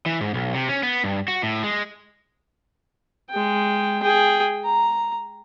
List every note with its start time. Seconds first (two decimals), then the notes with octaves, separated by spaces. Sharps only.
0.06 E3
0.21 G#2
0.34 B1
0.54 C3
0.69 C#4
0.83 B3
1.04 G2
1.28 F#4
1.43 A2
1.64 G#3
3.30 G#3 G5
4.03 G#4 G5
4.65 A#5